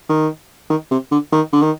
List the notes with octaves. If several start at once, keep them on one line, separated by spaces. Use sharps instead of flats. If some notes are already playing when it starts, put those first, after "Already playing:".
D#3
D#3
C3
D3
D#3
D3
D#3